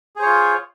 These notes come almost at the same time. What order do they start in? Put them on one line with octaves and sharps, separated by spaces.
G#4 C5 C#5 F4